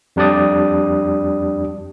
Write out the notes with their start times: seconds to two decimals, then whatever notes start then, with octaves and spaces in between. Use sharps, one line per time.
0.16 F2 G3 D4 G4 D5 D#6